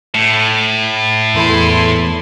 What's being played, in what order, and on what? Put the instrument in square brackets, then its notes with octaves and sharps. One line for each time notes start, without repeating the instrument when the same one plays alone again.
[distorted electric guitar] A2
[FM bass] E2 [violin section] E4 A4 C6